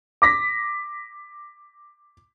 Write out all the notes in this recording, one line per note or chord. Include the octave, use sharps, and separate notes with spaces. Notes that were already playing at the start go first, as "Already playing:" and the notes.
D6 A#6 B6